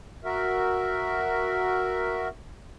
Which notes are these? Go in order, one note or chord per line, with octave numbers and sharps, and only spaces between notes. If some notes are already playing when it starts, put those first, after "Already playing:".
F#4 A#4 E5